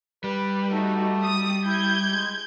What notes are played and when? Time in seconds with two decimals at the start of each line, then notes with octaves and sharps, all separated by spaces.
0.24 G3 B4
0.71 A3 D#4 F#4
1.24 D#6
1.65 E4 G6 G#6
2.08 G#3